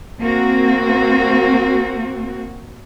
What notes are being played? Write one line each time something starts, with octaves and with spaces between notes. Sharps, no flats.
A#3 C4 F#4